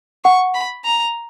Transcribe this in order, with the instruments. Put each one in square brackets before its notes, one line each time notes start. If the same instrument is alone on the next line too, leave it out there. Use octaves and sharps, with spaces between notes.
[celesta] F#5 [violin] C#6
[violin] B5
A#5